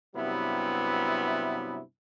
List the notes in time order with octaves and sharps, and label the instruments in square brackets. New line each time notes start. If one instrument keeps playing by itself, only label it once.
[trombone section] G2 C3 F#3 B3 E4